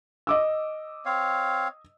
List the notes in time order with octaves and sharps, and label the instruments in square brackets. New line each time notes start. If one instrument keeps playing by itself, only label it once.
[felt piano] D#5 D6 E6
[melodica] C4 C#5 F5